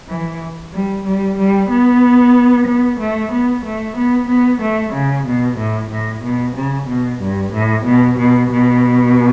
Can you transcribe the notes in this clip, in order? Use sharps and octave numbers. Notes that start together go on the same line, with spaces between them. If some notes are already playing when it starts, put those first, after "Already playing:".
E3
G3
G3
G3
B3
B3
A3
B3
A3
B3
B3
A3
C#3
B2
A2
A2
B2
C#3
B2
G2
A2
B2
B2
B2